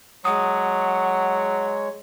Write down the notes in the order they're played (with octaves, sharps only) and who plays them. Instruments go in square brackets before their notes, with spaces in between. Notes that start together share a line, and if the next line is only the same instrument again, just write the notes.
[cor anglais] F#3 [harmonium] G#3 C#5 [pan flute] F#5 [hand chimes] D#6